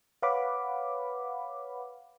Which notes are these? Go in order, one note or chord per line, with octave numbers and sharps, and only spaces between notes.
B4 C#5 F5 F#5 B5 D6